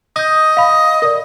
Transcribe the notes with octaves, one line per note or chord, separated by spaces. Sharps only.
D#5 D#6 G6
F5 B5
A#4 D5